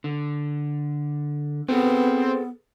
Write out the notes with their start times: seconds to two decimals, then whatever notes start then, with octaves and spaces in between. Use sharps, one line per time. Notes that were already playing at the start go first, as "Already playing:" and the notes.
0.04 D3
1.68 B3 C4 G#4 A4 B4